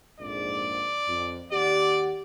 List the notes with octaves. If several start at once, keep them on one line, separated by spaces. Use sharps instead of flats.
A#1 F2 G#2 D5
F2
D#2 G4 D5 F#5